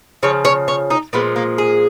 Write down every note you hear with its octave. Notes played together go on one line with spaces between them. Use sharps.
C#3 F3 C#5
C#5
C#5
D#4
A#2 F3 G#3 B3
A#3
G#4